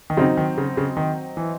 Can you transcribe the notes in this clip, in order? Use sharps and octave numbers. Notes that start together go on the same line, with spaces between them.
D#3
C#3 F#3 C4 D#4
D#3
C#3
C#3
D#3
E3